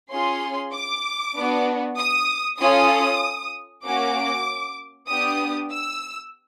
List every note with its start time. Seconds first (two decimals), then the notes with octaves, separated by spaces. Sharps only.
0.11 C#4 F4 G#4 C6
0.73 D6
1.36 B3 D4 F#4
1.98 D#6
2.60 C#4 F4 A4 D#6
3.84 A#3 C#4 F#4 D6
5.09 B3 D4 G4 D#6
5.71 E6